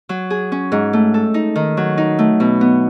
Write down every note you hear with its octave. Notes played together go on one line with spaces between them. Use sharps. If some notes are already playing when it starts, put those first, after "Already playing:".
F#3
G#4
C#4
G#2
A3
A4
D#4
D#3
F#3
D#4
A3
B2
B3